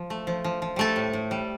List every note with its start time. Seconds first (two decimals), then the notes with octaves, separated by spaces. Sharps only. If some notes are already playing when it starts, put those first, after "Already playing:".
Already playing: F3
0.10 A3
0.27 F3
0.44 F3
0.62 F3
0.76 G3 A3 A4
0.96 A2
1.13 A2
1.31 G3